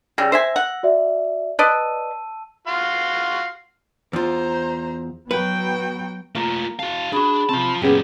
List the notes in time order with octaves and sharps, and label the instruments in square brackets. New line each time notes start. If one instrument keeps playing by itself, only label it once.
[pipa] C#3 G3 [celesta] E6 A#6
[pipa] C5 E5 G#5
F#5
[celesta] F#4 D5 E5
[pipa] B4 D5 D#5 [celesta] A5 E6 D#7
[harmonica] F#4 F5 C6
[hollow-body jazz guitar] E2 F4 [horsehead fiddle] C5 A#5
[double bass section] F#3 B3 [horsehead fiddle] F#4 G5 [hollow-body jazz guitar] B4
[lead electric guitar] A3 F4 [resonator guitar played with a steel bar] A#3
[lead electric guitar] F#4 F5 [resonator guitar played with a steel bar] A5
[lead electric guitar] D4 [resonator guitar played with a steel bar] F#4 G#4 [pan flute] B5
[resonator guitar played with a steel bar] C3 C4 [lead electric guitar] F4 A5
[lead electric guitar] F#2 A#2 [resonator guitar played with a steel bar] B3 C#4 G4 [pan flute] G#4